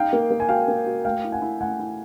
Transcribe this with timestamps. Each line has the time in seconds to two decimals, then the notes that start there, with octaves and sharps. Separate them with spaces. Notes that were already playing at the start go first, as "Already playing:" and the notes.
Already playing: D#4 F5 G5
0.13 A#3
0.31 A#3
0.40 G#5
0.49 F#4 F5 G5
0.68 A#3
0.86 F#4
1.05 A3 F5 G5
1.24 E4
1.32 F#5 G#5
1.42 E4
1.61 A3 F#5 G#5
1.80 E4